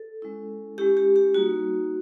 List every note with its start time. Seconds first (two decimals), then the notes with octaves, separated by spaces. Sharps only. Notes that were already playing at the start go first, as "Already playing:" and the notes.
Already playing: A4
0.22 G#3 C#4 E4
0.78 G#3 C#4 E4 G4
0.97 G4
1.16 G4
1.34 G3 A#3 D#4 F#4